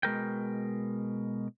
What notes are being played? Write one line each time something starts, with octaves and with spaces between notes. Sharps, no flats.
B2 G#3 A#4 G5